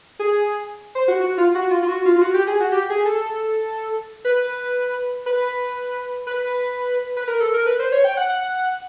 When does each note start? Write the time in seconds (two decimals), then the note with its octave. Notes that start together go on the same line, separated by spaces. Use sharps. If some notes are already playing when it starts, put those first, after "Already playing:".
0.19 G#4
0.95 C5
1.08 F#4
1.20 F#4
1.38 F4
1.55 F#4
1.71 F4
1.83 F4
1.88 F#4
2.06 F4
2.16 F4
2.21 F#4
2.34 G4
2.47 G#4
2.60 F#4
2.72 G4
2.90 G#4
3.06 A4
4.25 B4
5.26 B4
6.27 B4
7.17 B4
7.28 A#4
7.40 A4
7.54 A#4
7.66 B4
7.79 C5
7.92 C#5
8.04 G5
8.17 F#5
8.29 F#5